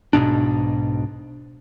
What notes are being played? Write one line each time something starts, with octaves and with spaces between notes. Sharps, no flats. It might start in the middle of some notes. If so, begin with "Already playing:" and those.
B1 G#2 B2 D4